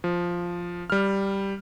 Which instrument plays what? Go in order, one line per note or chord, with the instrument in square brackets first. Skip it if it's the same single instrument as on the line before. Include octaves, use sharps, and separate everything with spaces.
[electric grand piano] F3
G3 F6